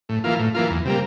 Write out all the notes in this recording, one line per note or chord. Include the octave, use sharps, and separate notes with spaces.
A2
E3 A#3 F4
A2
E3 A#3 F4
E2
C3 G3 A#3